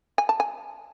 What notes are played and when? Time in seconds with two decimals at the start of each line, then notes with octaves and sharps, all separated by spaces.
0.18 G#5
0.29 A5
0.40 G#5